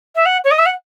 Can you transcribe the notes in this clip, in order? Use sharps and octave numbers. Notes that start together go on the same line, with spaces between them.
E5
F#5
C#5
D#5
E5
F#5